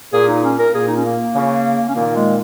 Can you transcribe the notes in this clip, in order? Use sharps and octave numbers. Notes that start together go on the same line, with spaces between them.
A#2 G#4
D#4
C#4
A#4
A#2 G#4
D#4
C#4
A#3
C#3
C#4
A#2 D#3 A#3
G#3